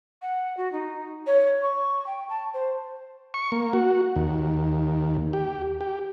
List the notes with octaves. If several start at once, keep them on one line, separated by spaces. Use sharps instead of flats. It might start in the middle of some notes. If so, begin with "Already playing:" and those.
F#5
F#4
D#4
C#5
C#6
G5
A5
C5
C#6
A#3
F#4
D#2
G4
G4